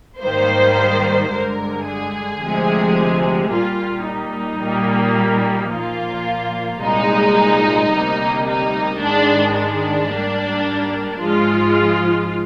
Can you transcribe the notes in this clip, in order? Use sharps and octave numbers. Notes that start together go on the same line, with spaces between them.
G#2 D#3 G3 A#3 C5
G2 D3 G#3 A#4
G#4
D2 C3 F3 G#3
A#2 G3 A#3 F4
D#4
A#2 G3 A#3
A#2 F3 A#3 F4
C2 A#2 G#3 D#4
D2 C3 G3 A#3
D#4
G#2 D#3 G#3 D4
D4
G#2 G3 A#3
G#2 F3 G#3 F4